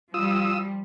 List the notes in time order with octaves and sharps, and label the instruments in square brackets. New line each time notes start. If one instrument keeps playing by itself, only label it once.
[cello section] F3 G3 [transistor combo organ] F4 D#6 E6